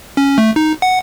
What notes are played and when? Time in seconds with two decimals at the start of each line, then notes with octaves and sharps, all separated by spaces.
0.17 C#4
0.38 A3
0.56 D#4
0.82 F#5